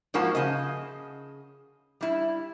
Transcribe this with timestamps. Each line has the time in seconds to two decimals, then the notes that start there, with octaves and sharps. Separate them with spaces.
0.14 G#2 F3 A#3 F#4 A5
0.35 C#3 D#5
2.01 G3 E4